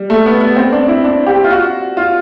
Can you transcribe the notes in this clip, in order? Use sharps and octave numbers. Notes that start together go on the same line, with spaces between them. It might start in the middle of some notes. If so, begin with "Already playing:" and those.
Already playing: G3
A3
B3
B3
C4
D4
E4
D4
G4
F4
F#4
F4